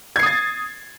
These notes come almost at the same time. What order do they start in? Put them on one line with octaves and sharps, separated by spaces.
G#6 C7 D#6 A6